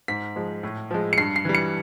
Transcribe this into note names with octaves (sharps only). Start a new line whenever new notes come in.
G#2 B6
F3 G#3
A2
F3 G#3
C#7
G2 C7
C7
E3 G3
C#7